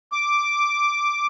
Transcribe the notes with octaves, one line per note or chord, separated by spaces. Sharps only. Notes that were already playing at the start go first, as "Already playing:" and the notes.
D6